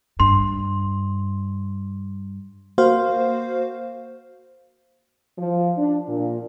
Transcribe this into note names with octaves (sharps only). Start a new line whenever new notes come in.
G2 C6
A#3 F#4 C5 F5
F3
D4
A#2